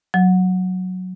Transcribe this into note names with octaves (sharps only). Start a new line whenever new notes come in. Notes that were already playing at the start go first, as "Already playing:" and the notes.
F#3